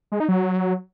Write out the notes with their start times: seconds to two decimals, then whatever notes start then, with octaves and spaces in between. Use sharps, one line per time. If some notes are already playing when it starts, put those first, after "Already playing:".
0.12 G#3
0.20 D#4
0.29 F#3